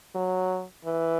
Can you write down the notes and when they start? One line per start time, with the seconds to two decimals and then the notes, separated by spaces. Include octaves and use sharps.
0.15 F#3
0.85 E3